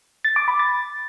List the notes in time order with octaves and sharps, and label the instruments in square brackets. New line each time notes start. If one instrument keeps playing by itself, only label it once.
[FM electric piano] A6
D6
B5
A6